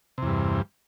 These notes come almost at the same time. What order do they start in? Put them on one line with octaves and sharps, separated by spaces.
C3 E2 G2